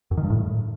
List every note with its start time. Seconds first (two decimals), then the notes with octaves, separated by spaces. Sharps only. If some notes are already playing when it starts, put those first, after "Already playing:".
0.11 F#2
0.17 D#3
0.24 G2
0.30 A2